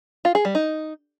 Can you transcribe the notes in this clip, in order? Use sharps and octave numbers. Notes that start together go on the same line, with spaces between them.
F4
G#4
G3
D#4